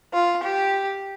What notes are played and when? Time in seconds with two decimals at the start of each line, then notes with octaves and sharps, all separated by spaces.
0.13 F4
0.44 G4